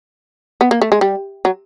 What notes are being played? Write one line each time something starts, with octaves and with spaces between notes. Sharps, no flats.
B3
A#3
A3
G#3
G3
F#3